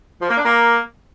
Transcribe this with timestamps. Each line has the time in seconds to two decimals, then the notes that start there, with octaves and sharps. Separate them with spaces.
0.22 F3
0.30 A#3
0.37 D4
0.45 A#3